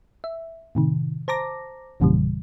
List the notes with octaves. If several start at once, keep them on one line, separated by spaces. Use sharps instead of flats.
E5
A2 C3 D#3
C5 A5 A#5 D6 A#6
G#1 F2 A#2 C#3 E3 G3